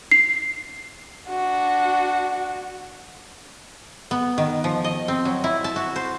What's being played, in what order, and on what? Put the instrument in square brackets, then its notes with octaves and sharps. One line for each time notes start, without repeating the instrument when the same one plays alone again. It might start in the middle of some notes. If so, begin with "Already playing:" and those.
[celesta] C7
[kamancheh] D4 F#4
[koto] B3
D#3
F3
D#5
C4
F#3
E4
A5
F#4
C5